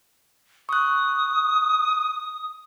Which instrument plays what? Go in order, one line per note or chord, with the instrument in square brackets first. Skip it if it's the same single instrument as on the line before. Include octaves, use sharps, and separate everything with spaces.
[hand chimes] C#6 F#6 [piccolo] D#6